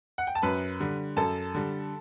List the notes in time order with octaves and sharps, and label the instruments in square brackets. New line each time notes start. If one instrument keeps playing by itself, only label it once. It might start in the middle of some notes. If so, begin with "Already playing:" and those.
[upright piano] F#5
G5
A5
F#2 B4 B5
D3 G3
F#2 A4 A5
D3 G3